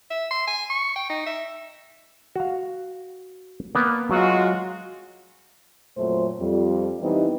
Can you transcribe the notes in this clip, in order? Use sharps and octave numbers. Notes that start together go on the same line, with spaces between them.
E5
C6
G#5
C#6
G5
D#4
E5
F#4 F5
A#3 B3 A#4
F#3 G#3 F4 F#4
F2 A#2 F#3 A3 C5
F2 G3
E3 G3 B3 C4 D#4